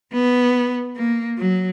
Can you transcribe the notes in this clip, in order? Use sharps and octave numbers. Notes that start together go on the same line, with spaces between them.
B3
A#3
F#3